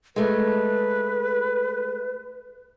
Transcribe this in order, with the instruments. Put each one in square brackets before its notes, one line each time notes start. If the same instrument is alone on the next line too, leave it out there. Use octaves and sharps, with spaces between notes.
[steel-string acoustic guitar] G#3 A3 [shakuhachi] B4